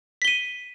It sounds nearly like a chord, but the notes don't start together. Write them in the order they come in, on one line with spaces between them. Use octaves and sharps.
B6 G7 D#7